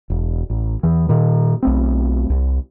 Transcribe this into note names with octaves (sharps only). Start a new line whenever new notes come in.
E1
A1
E2 E3
A#2 D#3
B1 A3 C4
C2